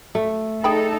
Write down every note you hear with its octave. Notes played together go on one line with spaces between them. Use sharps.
A3
D#4 G#4 A4 G5 B5